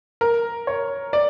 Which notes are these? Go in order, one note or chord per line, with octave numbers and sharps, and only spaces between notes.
A#4
C#5
D5